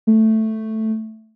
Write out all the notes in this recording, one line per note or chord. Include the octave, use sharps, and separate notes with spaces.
A3